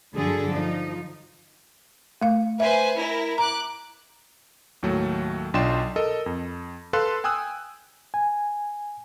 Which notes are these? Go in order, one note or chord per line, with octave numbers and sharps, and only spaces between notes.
G2 D3 F#3 G#4 A4
F3 D#4
A3 F5
B4 C5 E5 G#5
E4 A#4
A#5 D6 F#6
D#2 A2 F#3 A3
B1 D4 F4 G5 C6 E7
A4 A#4 D#5
F2
A4 B4 F5 C6 F#6
G5 G#5 D#6 E6 F#6
G#5